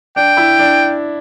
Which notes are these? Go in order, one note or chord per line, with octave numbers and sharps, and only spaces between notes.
D4 G5
E4
D4